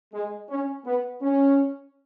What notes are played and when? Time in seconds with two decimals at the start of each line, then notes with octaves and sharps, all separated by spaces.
0.13 G#3
0.50 C#4
0.86 B3
1.22 C#4